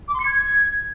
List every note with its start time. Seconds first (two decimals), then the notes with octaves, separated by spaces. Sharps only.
0.08 D6
0.14 C6
0.20 C#7
0.26 G#6